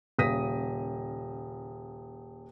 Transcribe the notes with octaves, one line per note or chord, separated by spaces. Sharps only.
D#1 C#3 D#6 A#6 B6 D#7